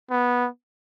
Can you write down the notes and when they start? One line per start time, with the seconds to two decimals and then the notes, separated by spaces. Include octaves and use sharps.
0.10 B3